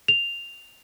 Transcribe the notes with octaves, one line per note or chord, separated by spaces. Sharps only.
F7